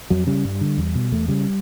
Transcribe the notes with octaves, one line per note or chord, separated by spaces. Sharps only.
F2 F#3
C#3 G3
G2
D3
E2
B2
E2 A3
C#3 G3